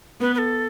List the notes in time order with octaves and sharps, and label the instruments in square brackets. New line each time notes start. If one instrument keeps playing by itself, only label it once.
[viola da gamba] B3 [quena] B4
[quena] B4
A4